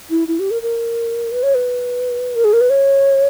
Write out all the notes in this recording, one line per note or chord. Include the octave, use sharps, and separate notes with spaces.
E4
E4
G4
A#4
A#4
B4
C#5
B4
A#4
G#4
A#4
B4
C#5